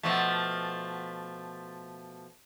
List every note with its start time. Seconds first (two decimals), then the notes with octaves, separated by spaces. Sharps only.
0.03 B2 F3 A3